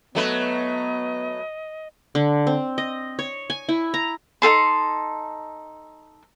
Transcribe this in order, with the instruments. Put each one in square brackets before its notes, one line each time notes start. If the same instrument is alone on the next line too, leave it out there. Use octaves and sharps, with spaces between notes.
[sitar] F#3 A3 B4 [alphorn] B3 [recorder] D#5
[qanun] D3
C4
D#5
C#5
G#5
E4
A#5
[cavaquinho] D#4 G#4 A4 C6